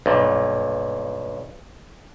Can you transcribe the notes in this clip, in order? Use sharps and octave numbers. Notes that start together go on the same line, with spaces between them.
B1 G2 A#2